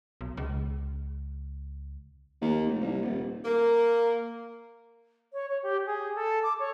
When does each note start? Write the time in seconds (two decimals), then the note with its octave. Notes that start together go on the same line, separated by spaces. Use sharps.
0.21 B1
0.37 C#2
2.42 D#2
2.67 F1
2.81 C2
3.02 D#1
3.45 A#3
5.33 C#5
5.48 C#5
5.62 G4
5.86 G#4
6.15 A4
6.43 D6
6.59 C#5